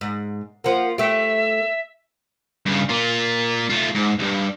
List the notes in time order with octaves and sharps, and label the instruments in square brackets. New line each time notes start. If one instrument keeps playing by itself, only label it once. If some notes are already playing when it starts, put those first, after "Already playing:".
[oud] G#2
[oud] F3 A#3 [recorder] F#5
[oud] A3 G4 [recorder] E5
[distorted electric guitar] G2 C#3
A#3 F4
A3 F4
G#2
C2 G2